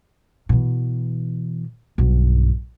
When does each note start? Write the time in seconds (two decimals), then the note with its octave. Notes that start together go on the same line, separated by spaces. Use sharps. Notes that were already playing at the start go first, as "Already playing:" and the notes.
0.49 B2 E3
1.98 B1 G2